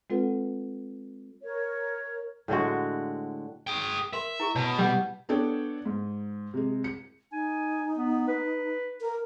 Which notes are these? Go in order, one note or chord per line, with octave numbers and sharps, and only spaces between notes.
G#3 C4 F4 A4 B4 F#5
A#4 C#5
A2 D3 G#3 F#4
G#4 G5
A#4 E5 B5 C6
E4 G#4 C#6
B2 C#5 A5 B5
G3 D5 F#5
B3 D4 A4 C#5 D5 G5
G#2
C3 G#3
C#7
D#4 G#5
B3
B4
A#4